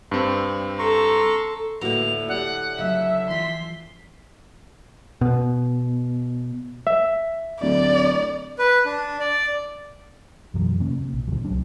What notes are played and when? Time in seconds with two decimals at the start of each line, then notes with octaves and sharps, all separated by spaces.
0.11 G2 C4
0.79 A4 A#5 C6 C#6
1.81 A2 D3 A#3 E4 F#4 B4 F7
2.28 G4 D5 F#5
2.78 C#3 F#3 A3 E5
3.30 E3 F3 C6 B6
5.21 B2
6.87 E5
7.62 D1 D5
8.59 B4
8.85 D4
9.20 D5
10.54 F#2 B2 E3 F#3
10.80 C3 A#3 C#4
11.00 C3
11.13 A#1
11.27 D2 A#2 C#3 F3
11.44 C2 F#3 D4